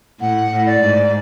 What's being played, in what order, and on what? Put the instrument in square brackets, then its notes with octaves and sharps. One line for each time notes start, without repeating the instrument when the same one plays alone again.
[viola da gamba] A2 [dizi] F#5
[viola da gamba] A2
[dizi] D5
[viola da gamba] G#2